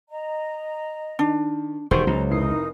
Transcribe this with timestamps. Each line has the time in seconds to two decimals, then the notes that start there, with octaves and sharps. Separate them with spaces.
0.09 D#5 A#5
1.19 D#3 D4
1.91 E1 D#3 G4 C5 C#6
2.07 C#2 F#3 G#3 A#5
2.30 F1 D#4 E4 A#4 D#6 C7